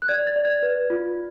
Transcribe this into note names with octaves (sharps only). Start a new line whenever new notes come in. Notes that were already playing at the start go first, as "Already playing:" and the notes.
F#6
D5 G#6
A6
D5
G#6
B4
F4